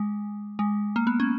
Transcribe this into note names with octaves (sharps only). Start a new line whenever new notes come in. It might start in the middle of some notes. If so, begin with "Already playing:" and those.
Already playing: G#3
G#3
A#3
B3
C#4